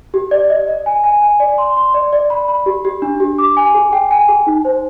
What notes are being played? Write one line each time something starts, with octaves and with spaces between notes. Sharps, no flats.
G4
D5
D#5
D#5
G#5
G#5
G#5
D5
C6
C6
D5
D5
B5
B5
G4
G4
D4
G4
D6
G#5
G#4
G5
G#5
G#4
D#4
C5